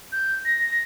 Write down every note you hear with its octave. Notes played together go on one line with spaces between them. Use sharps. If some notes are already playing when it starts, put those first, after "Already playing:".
G6
A#6